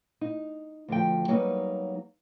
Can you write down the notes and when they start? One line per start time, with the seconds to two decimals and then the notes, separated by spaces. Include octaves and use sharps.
0.21 D#4
0.88 D2 F3 G5
1.28 F#3 G3 A#3 B3 D#4